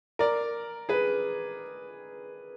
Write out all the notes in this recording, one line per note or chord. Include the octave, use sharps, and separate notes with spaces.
A#4 D5
G#4 B4